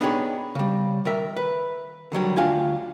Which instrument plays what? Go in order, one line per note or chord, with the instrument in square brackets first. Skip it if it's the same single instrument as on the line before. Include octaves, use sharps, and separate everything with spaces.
[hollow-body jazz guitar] B3 D4 D#4 G4 G#4 C#5
C#3 G3
D#3 A#4 E5
B4
D3 D#3 F#3 G3
D2 D4 F4 G4 F5 G#5